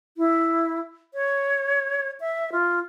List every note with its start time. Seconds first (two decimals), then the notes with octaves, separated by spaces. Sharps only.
0.17 E4
1.14 C#5
2.20 E5
2.52 F4